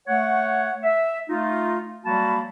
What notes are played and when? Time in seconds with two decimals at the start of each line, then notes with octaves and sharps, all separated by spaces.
0.07 A3 C#5 F#5
0.83 E5
1.29 A3 D#4 F4
2.05 F#3 G3 A#3 F#4 A5 B5